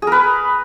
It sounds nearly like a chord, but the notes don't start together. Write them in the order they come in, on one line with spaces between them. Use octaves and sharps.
G#4 A#4 B4